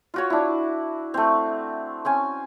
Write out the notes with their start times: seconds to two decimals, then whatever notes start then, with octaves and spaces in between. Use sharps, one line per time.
0.14 F4 F#4 C#5
0.30 D4 E4
1.14 A3 C4
2.05 C4 C#4 G#5